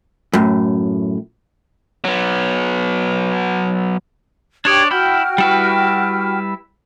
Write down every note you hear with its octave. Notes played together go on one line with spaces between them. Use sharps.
F#2 A2
F#3 B3
D4 G4 C#5 D5 D#6 G#6
E4 F#4 G5 B5 F6 G6
G3 E4 B4